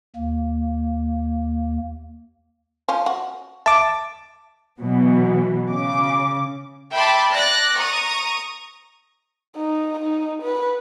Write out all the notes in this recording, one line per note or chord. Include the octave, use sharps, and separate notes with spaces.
D#2 A#3
F3 C#4
F#4
E5 A5 D6
B2 E3 F#3 B3
C#3 D6
E5 G5 A5 B5 C6 D6
D5 F#6 A#6
A#5 C#6 D#6
D#4
D#4
B4